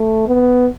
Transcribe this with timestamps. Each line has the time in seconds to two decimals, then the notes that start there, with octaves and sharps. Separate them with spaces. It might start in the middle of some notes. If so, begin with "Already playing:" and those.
Already playing: A3
0.27 B3